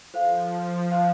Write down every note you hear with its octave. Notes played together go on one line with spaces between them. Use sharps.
F3 A4 C5 F5
C5 F5 A5 C6